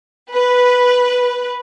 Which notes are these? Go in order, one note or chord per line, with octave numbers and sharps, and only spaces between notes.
B4